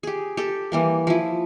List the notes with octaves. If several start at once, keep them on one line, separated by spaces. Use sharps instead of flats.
G4 G#4
G4 A4
E3 G3 A#3
F3 E4